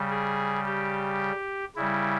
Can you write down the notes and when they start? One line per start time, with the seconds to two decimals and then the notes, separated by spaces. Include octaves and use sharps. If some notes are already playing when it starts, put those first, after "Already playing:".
Already playing: C#3 G3
0.10 G#4
0.66 G4
1.76 C#3 G3 E4